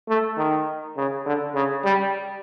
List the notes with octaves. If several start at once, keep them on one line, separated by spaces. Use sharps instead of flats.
A3
D#3
C#3
D3
C#3
G3